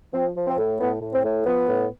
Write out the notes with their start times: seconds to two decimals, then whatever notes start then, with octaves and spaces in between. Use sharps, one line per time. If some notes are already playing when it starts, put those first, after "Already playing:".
0.13 F3 C4
0.36 F3
0.47 C4
0.58 A2
0.79 A2 B3
1.02 A2
1.13 C4
1.24 A2
1.46 F3 B3
1.68 A2